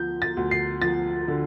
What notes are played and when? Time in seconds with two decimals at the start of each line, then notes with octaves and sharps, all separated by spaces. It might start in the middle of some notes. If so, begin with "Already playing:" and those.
Already playing: D2 F3 G6
0.22 A6
0.37 D2
0.51 C7
0.82 F3 A6
1.28 D3